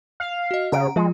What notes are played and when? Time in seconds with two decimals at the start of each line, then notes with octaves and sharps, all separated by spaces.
0.20 F5
0.51 F#4 D#5
0.72 C#3 F#5 A#5 D7
0.96 F3 G#3 F4